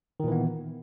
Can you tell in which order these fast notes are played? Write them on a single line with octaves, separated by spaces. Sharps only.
D#3 A#2 E3 B3